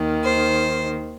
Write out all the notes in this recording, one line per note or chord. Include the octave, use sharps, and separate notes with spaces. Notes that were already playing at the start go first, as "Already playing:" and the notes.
Already playing: D#2 D#3
C5